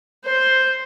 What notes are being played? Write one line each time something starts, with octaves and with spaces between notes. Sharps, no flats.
C5